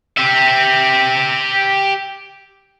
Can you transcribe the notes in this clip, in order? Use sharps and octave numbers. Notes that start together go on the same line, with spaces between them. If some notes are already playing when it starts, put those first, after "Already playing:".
G4 E5